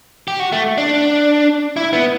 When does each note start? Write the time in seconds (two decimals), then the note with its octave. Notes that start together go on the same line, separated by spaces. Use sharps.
0.28 G4
0.40 F#4
0.52 A3
0.78 D4
1.77 E4
1.93 B3